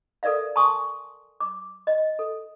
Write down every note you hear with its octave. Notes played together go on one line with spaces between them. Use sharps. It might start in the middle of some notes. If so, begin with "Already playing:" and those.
A4 A#4 D5 E5 F5
G#5 A5 C6 C#6 D#6
D6
D#5
A4